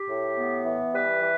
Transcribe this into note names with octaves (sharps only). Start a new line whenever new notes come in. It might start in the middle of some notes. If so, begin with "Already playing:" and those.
Already playing: G4
A2
B3
E3
G3 B4
E3